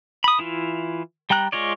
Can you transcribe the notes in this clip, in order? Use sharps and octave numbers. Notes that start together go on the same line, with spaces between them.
B5 D#6
E3 E4 F4
G3 G5 A#5 F#6
G#3 F4 C#5 D5